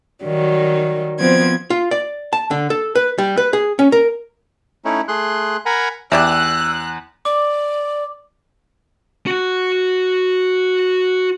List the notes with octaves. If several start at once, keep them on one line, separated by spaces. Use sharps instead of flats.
D#3 F#3 G3
F3 B3 C4 G#6
F4
D5
A5
D3
A4
B4
G3
B4
G#4
C#4
A#4
A3 C#4 D#4 E4
A3 G#4 C6 F#6
A#4 F#5 G#5 A#5 B5
E2 G4 D5 E5 E6 F#6
D5 D6
F#4 F#5